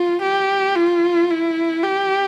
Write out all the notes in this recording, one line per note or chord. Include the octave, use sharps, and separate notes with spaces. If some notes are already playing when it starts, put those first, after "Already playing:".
Already playing: F4
G4
F4
E4
G4